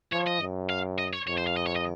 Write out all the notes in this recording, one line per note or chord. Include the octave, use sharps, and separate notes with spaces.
F3 C#5
D#5
F#2
F5
D#5
C#5
F2 C#5
C5
F5
D#5
C#5
D#5